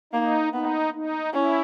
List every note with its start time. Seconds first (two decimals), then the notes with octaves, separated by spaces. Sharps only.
0.13 A#3 D#4
0.54 B3 D#4
0.94 D#4
1.33 C#4 E4